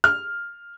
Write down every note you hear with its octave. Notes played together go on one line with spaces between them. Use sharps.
F6